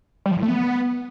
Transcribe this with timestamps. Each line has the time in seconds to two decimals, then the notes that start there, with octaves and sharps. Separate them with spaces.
0.26 G3
0.31 F3
0.37 A2
0.43 A3
0.48 B3